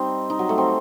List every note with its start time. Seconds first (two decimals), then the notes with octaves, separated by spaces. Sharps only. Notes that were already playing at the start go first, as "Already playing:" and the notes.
Already playing: G3 C4 D#4
0.30 D#4
0.39 F#3
0.49 A3
0.58 C4